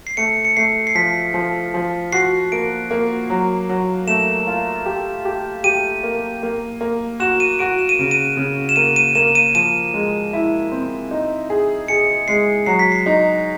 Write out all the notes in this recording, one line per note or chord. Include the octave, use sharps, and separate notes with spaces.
C7
A3 C#7
C#7
A3 C7
C7
F3 B6
F3
F3
F#4 C7
A#3 D7
A#3
F#3
F#3
A3 E7
F4
G4
G4
G4 D#7
A#3
A#3
A#3
F#4 E7
D#7
F#4 D7
E7
D#7
C#3 D7
D#7
C#3
E7
A#3 D#7
D#7
A#3 E7
D#7
F3 D#7
G#3
E4
C4
D#4
G#4
G#4 C#7
G#3 C7
F#3 C7
B6
C7
D#4